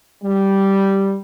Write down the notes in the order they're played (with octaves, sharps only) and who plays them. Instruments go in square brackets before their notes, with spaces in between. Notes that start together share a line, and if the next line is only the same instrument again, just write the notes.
[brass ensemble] G3